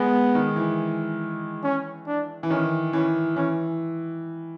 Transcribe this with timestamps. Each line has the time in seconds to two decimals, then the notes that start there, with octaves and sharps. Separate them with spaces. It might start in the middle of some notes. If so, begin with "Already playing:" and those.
Already playing: G#3 B3
0.35 D#3
0.56 E3
1.64 C#4
2.07 D4
2.43 E3
2.50 D#3 C#4
2.93 E3 C#4
3.36 E3 C#4